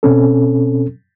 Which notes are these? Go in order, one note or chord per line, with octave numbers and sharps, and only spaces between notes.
B2 C4 C#4 A4